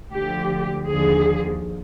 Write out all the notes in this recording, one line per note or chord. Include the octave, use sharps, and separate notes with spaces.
D2 D3 F3 G4
D#2 D3 F3 G#4